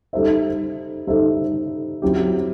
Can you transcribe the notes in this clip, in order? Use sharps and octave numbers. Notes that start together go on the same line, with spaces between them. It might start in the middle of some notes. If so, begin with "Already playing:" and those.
G3 D#4 A4 C5 E5
G3 D#4 A4 C5 E5
F#3 C4 E4 G4